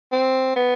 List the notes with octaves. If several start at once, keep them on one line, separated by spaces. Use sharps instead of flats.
C4
B3